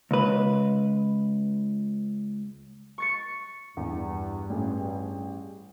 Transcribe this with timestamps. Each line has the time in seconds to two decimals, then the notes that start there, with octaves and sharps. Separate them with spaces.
0.11 C#2 B4
2.98 C#6 A6 C#7
3.77 E2 G2
4.50 A1 G#4